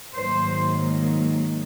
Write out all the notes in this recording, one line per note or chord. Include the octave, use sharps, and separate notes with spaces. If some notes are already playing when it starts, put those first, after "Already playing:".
G#2 D#3 F#3 A#3 C5